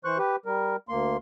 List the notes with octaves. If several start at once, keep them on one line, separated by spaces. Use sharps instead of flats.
E3 C5 C#6 F#6
G4 B4
G3 A#4
D2 A#3 C6